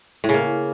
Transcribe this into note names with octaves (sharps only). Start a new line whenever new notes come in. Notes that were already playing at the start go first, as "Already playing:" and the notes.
A2
C#3
A#3